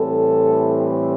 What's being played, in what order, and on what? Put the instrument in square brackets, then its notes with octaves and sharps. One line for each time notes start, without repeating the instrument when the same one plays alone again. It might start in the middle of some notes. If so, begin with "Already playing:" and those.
Already playing: [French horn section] A2 E3 G3 C4 A4